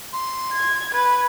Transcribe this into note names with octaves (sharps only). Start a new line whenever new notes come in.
C6
G#6
B4 G#6